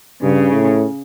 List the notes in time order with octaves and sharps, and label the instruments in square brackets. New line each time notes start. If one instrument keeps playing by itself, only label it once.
[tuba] G2 [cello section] C#3
[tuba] A2